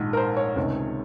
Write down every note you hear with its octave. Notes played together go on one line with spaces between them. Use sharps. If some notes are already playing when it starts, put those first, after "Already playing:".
Already playing: A#1 G#2 D#3
A#4
C5
C#5
C#2 C3 D#3